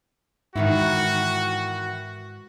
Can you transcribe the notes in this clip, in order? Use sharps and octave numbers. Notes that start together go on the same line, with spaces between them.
G#2 D#3 E3 E4 F#4